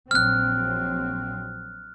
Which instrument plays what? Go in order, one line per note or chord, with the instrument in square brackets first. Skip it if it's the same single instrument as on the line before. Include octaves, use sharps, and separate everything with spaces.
[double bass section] A#1 F#3 C4 [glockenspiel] F6 F#6